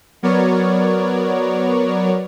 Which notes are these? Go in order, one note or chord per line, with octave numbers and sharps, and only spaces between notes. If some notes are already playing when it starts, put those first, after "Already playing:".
F#3 B3 A#4 C#5 D5